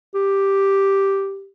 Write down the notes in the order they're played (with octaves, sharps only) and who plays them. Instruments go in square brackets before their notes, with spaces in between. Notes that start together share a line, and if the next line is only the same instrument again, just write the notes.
[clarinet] G4